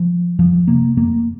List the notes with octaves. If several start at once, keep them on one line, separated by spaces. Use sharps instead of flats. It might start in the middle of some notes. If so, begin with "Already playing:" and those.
Already playing: F3
F2 F3
C3 A#3
F2 A#3